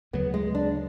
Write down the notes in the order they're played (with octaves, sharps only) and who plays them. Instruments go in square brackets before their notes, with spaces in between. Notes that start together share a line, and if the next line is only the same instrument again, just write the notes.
[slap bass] D2 C#3 F#3 [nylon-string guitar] B3
[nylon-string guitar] G#3
D4